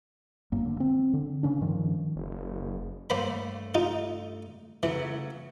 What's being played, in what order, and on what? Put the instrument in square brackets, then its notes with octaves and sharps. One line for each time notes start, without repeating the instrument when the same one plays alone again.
[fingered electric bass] G1 F#2 A#3
D3
C4
D3
C#3 C#4 D4
G2 D#3 F3
[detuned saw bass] F#1
[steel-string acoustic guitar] G2 A3 [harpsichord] A#3 C5 B5
[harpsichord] D#4 F4
[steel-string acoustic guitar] C#3 F#3 A3 [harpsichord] E3